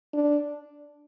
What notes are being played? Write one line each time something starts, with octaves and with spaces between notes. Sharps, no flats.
D4